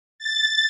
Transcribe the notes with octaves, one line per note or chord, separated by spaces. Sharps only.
A6